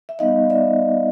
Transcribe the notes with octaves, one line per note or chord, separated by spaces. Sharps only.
E5
G3 B3 D#4 D#5 F5
D5 E5